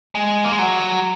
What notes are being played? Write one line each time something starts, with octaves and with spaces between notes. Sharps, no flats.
G#3
A#3
G#3
F#3